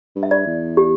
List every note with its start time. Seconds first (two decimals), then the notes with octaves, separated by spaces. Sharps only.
0.16 G2
0.23 E5
0.31 D5
0.46 E2
0.77 G4